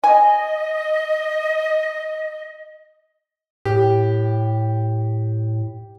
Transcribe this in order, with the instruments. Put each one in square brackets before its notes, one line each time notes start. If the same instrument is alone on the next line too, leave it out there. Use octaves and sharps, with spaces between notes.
[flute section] D#5 [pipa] G#5
[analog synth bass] A2 [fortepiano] G4